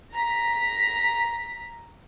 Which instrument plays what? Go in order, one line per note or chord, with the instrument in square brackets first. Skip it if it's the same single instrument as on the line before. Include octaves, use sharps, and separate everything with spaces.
[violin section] A#5 B6